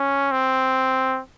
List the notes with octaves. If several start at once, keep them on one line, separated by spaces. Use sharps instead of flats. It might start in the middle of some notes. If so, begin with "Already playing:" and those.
Already playing: C#4
C4